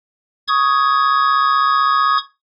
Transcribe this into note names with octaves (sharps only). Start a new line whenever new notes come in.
C#6 D#6 G#6